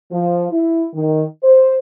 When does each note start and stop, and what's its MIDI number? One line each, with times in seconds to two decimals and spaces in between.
0.12 0.47 53
0.52 0.85 64
0.94 1.25 51
1.43 1.77 72